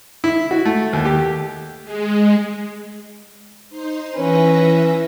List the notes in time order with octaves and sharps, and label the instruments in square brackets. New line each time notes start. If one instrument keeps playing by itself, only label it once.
[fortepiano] E4
F#4
A3
D#2
G4
[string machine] G#3
D#4 C5 C6
[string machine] E3 E5 A#6 [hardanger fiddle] C#4 B4